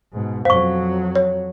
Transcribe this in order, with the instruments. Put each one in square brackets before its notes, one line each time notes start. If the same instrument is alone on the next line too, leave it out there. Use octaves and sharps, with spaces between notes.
[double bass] G#2 B2
[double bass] F2 F#3 [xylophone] C5 [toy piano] F5 C#6
[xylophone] C#5